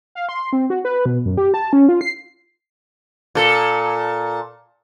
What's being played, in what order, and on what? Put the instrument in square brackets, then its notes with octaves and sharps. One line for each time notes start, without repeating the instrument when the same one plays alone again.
[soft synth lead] F5
C6
C4
F#4
B4
B2
F#2
G4
A5
C#4
F4
C7
[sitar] A#2 A4